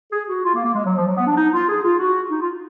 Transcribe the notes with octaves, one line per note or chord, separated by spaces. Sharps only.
G#4
F#4
F4
A#3
A#3
G#3
F#3
F3
F#3
B3
D4
D#4
F4
G#4
F4
F#4
D#4
F4